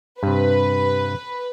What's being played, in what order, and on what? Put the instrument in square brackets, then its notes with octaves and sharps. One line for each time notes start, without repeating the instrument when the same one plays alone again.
[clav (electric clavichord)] G2 C3 [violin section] B4